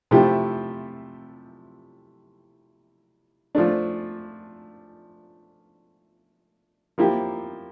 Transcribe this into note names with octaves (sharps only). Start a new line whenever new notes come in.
C3 F3 A3 E4 G4
F3 A3 D4
F3 A#3 E4 G4